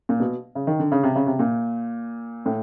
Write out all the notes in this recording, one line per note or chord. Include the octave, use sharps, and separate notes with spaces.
A#2
B2
C#3
D#3
D3
C#3
C3
C#3
C3
A#2
A2